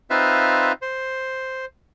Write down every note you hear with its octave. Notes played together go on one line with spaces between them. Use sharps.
C4 D#4 F4 B4 E5 F5
C5